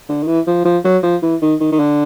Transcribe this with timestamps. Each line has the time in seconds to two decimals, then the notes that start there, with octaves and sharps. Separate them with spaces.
0.09 D3
0.23 D#3
0.27 E3
0.47 F3
0.65 F3
0.84 F#3
1.03 F3
1.22 E3
1.41 D#3
1.60 D#3
1.72 D#3
1.79 D3